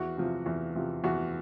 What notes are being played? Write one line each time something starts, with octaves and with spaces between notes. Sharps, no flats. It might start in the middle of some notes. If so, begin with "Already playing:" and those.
Already playing: E2 F#4
C3 F3
E2
C3 F3
E2 F#4